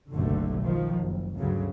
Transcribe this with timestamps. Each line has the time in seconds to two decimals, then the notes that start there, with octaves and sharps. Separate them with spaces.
0.13 F#1 B1 F#2 D3 G3 A3
0.62 D#3 F3
1.00 F#1
1.37 D2 G2 C#3 F#3